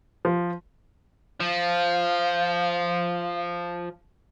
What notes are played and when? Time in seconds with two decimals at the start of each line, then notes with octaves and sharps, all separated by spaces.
0.25 F3
1.40 F3 F5